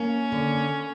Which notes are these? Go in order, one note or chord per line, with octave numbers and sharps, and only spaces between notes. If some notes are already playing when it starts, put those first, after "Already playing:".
Already playing: A#3 C#4
D3